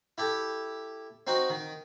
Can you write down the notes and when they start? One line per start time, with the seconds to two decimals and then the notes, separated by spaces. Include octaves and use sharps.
0.18 E4 G4 A4
1.27 C4 D#4 F#4
1.50 D#3